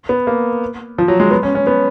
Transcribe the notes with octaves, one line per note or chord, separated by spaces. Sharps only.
B3
A#3
F3
F#3
G#3
B3
C#4
C#4
B3